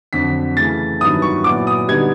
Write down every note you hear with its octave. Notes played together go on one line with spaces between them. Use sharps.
F2 D3 F#3 B6
C#3 E3 A3 A6
G2 D#3 F#3 B3 E4 D#6
C#6
A#2 F#3 B3 E4 D6
D#6
D3 G3 B3 D#4 G#6